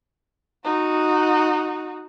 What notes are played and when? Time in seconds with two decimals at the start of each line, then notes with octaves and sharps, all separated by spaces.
0.64 D#4 F#4